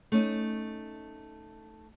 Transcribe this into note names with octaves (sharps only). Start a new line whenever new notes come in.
A3 C#4 D#4